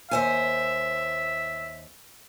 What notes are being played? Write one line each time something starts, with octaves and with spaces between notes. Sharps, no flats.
D#2 C5 E5 G#5